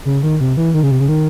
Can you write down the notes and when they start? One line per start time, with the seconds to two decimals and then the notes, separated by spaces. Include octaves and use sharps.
0.05 C#3
0.23 D#3
0.41 C3
0.57 E3
0.74 D#3
0.83 C#3
0.91 C3
1.00 C#3
1.09 D#3